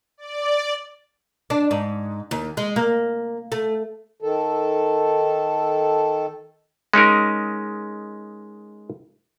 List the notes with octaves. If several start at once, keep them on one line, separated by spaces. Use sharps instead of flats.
D5
D4
G#2
D#2
G#3
A#3
A3
D#3 A4
G#3 C#4 D#4 A#4